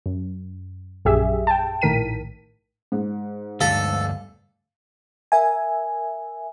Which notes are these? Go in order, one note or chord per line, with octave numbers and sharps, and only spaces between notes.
F#2
A#1 F#2 G4 G#4 E5
G5 A5
A#1 A2 D#3 A#4 B6 D#7
G#2
D2 G2 A4 F5
A#4 E5 G#5